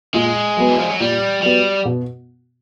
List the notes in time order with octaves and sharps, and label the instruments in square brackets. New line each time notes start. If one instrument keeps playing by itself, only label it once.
[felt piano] A#2 [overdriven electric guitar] G#3
[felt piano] F#3 B3
[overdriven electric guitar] E3
F3
F#3
[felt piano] A#2 [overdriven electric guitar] G3
[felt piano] F#3 B3 [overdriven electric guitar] G3
[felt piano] B2